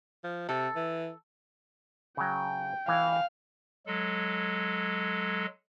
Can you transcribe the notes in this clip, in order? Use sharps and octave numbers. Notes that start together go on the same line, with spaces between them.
F3
C3 A4
E3
C#3 F#3 G5
E3 F5
F#3 G#3 A4